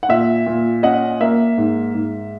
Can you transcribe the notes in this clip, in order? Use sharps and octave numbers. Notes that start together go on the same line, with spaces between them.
F#5
A#2 E5
A#2
C#4 D#5 F#5
A#3 E5
G#2
G#2